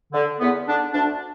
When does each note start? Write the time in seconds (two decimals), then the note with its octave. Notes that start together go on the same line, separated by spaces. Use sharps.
0.13 D3
0.40 E2 B3
0.67 D3 D4
0.94 D2 D4